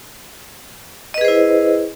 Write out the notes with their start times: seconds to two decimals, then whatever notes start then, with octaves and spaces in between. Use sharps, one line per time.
1.14 D#5
1.18 B4
1.21 G#4
1.25 C5
1.28 E4